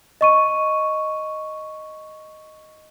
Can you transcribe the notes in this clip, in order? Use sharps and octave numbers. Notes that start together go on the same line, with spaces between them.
D#5 C#6 D#7